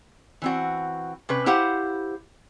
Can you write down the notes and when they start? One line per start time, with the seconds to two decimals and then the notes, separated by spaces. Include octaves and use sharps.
0.42 E3 C4 F#4
1.29 C3 C#4 B4
1.46 E4 G4 C5 F5 F#5